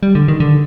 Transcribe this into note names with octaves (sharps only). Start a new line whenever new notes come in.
G3
D3
D#3
D3